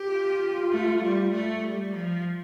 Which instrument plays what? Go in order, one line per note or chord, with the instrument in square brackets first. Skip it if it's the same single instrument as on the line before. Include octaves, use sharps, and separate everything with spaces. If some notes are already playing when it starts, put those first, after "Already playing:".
Already playing: [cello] G4
[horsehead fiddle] F4
[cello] A3
G3
A3
G3
F3